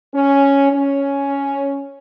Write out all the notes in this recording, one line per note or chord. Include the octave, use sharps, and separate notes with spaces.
C#4
C#4